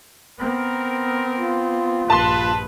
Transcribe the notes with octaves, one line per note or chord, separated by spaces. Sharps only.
B3 C4 A#4
F4
A#1 G2 B4 A5 C6